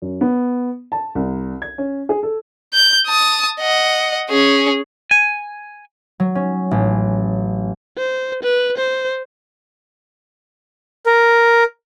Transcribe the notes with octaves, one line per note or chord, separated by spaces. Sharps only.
F#2
B3
A5
C2
G#6
C#4
G#4
A4
G6
A5 D#6
D#5 F#5
C#4 G#4
G#5
F#3
C#4
A1
C5
B4
C5
A#4